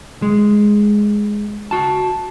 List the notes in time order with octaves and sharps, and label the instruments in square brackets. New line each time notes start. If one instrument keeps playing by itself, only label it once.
[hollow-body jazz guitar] G#3
F#4 A5